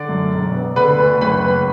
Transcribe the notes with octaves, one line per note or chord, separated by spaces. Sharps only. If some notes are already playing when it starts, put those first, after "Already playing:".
Already playing: D3 D5
F#2
E1
B3
D3 B4 B5
D2
F#1 B4 B5
F#1